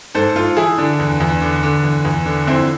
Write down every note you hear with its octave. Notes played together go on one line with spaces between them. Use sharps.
G#2 A4 C5
G#2 F4 A4
E3 E4 G#4
D3 D4
E2
E2
D3
D3
E2
E2
D3
F2 C4 E4